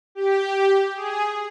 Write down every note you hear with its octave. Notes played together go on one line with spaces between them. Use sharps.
G4
G#4